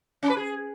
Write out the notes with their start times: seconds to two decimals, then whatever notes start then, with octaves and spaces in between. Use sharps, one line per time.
0.23 C#4
0.30 B4
0.37 G#4